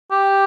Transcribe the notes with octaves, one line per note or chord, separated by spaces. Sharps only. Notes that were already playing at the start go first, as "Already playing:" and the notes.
G4